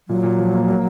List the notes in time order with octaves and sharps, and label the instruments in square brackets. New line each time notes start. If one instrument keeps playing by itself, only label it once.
[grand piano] A#2 [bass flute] F#3
[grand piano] A#2
F3
A#3
A#3